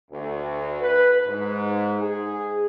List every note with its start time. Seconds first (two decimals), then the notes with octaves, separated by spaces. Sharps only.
0.11 D2
0.81 B4
1.26 G#2
2.01 G#4